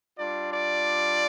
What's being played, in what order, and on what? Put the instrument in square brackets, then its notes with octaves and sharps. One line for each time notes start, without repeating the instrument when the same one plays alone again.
[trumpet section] G3 D4 F4 D5
D5